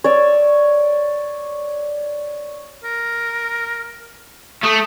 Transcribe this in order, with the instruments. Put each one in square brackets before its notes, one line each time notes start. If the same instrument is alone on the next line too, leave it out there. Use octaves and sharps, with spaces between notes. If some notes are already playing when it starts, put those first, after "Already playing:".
[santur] C#5 D5 E6
[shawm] A#4
[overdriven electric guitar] A3 [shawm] D#6